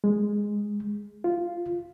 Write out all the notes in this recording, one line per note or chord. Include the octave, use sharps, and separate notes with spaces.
G#3
F4